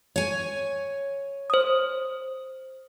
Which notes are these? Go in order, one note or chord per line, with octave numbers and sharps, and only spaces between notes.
C#5 G#5
C5 D#6